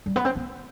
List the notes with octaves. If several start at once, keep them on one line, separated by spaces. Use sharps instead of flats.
G3
B3
C4
B3